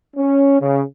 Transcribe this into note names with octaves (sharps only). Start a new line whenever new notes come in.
C#4
C#3